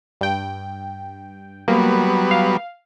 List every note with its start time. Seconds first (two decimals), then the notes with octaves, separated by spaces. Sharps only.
0.21 G2 G5
1.68 F#3 G3 A#3 B3
2.31 F5